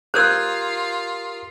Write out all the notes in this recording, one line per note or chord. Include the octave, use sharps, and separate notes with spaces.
F4 G4 A#4 C5 D#6 E6 G6 G#6